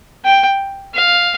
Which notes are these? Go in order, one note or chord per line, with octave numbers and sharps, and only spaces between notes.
G5
F5